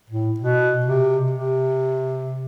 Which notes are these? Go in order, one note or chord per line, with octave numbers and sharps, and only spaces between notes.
A2
B2
C3
C3